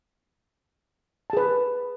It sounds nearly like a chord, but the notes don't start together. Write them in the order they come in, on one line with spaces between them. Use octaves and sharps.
A5 G#4 B4